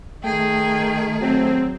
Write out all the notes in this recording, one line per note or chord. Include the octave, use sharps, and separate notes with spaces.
D#3 A3 G#4 G5
F#3 C4